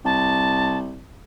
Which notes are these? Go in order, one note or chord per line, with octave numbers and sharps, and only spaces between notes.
C2 A5